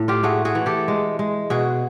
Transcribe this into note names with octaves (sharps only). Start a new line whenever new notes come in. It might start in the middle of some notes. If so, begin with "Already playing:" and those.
Already playing: A2
F4 G4
A3 F#4 G#4
F#4 G#4
E3
G4 A4
G#3
G#3
B2 F#4 G#4